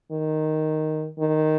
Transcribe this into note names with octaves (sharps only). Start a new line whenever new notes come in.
D#3
D#3